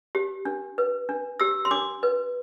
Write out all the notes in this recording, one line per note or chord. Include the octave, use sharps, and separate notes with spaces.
G4
D4
B4
D4
G4 E6
C6
D4 D6
B4